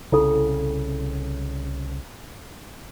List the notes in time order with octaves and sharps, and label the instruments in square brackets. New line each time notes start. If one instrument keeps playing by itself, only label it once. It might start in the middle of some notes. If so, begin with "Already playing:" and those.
[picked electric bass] C2 C#3 [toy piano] E4 A4